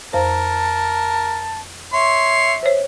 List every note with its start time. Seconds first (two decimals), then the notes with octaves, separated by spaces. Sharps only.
0.13 F2 A#4 C5 A5
1.93 C#5 E5 C6
2.63 C5 C#5